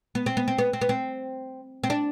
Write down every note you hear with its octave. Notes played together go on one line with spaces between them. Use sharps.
B3
C4
B3
C4
B3
C4
B3
C4
C4
D4